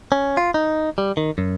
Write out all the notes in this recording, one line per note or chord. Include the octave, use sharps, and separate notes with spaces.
C#4
F4
D#4
G3
D#3
F#2